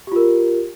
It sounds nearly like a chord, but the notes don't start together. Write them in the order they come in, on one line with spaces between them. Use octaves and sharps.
G4 F4 A#4